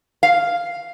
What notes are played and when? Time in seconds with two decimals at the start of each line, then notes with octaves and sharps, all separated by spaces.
0.23 F5